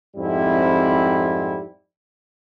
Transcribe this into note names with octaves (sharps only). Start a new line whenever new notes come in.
F2 G#2 G3 C4 E4